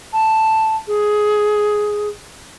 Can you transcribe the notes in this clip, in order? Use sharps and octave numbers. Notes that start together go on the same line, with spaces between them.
A5
G#4